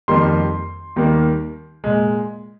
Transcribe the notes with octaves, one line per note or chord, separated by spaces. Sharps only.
F2 D#3 G3 A#3 C6
D#2 D#3 G3 A#3
A#2 G#3